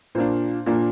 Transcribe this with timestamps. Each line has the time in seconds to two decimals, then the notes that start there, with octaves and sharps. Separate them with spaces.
0.15 A#2 A#3 D4 C5
0.66 A#2 A#3 D4